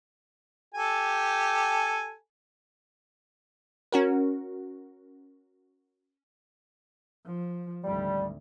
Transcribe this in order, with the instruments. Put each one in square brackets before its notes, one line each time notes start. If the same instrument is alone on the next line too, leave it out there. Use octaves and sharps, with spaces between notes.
[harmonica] G4 A4 G#5
[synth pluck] C#4 F#4 A#4
[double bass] F3
[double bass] G#1 D2 [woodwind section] G3